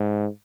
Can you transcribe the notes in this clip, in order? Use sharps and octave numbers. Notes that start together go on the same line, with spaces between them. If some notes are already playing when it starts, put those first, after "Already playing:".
Already playing: G#2